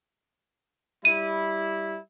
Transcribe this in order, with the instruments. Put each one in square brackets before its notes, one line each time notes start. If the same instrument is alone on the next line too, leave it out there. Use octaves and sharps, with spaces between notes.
[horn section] G3 E4 [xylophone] D#7